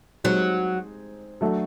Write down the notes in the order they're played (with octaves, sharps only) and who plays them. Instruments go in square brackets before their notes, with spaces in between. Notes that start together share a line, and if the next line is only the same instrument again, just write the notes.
[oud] F#3 [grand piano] G#3 C4 D#4 G#4
[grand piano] F#3 A3 D4 F#4 A4